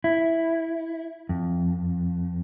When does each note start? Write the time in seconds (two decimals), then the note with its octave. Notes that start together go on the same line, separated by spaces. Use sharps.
0.04 E4
1.29 F2